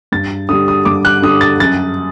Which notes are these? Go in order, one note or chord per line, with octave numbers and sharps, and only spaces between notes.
G2 A6
D3 G3 D#6
D#6
G2 D6
F#6
D3 G3 D#6
A6
F#2 A6